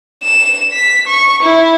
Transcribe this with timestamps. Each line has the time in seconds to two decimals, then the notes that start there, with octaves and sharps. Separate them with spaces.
0.23 E7
0.73 B6
1.07 C#6
1.42 E4